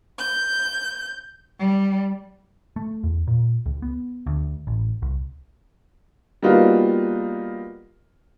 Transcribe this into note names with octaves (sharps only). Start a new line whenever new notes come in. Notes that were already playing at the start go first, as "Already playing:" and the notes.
G6
G3
A3
E2
A#2
C#2
B3
D2
A1
C2
G3 A#3 B3 D#4 F4 F#4